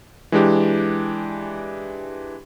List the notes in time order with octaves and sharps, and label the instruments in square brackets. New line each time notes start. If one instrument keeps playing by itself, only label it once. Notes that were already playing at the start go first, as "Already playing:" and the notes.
[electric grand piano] E3 G#3 D4 G4